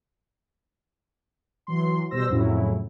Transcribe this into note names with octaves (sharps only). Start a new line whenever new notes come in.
E3 F#3 C6
B2 G3 C5 E6 A#6
F2 A2 C#3 F#3 C#4 E4